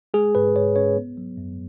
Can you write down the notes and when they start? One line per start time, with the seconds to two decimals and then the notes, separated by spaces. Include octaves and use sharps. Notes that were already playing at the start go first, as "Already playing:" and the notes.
0.14 G#3 G#4
0.35 G#2 B4
0.56 G#2 C#5
0.76 C#4 C#5
0.97 B3
1.17 F#3
1.37 F#2